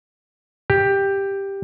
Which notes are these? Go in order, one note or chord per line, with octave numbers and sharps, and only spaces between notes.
G4